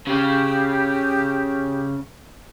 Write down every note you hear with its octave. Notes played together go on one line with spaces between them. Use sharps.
C#3 G4